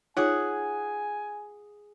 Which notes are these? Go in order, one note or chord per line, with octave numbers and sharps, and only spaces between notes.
D#4 F4 G#4 C#5 F#5 G#5